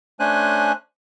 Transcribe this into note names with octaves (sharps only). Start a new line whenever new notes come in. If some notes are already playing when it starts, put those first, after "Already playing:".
A3 C#4 D4 C5 G#5 F#6